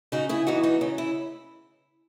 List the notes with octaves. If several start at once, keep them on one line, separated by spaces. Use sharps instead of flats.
C#3 D#4 F#4
E4 G#4
E3 B3 D#4 F#4
D#4 F#4
C#3 D#4
E4